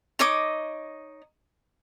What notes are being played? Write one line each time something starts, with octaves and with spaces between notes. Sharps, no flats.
D#4 C#5 D#5 D6